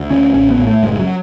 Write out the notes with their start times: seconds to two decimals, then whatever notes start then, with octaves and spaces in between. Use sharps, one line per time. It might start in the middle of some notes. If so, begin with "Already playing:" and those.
Already playing: D2
0.10 D3 C#4
0.34 A1 C#4
0.50 B3
0.59 A2
0.67 A3
0.83 F#1 G#3
0.99 F#3